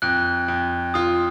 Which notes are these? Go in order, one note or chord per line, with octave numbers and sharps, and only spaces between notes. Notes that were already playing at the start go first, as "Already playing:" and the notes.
F2 F#6
F2
F4 D#6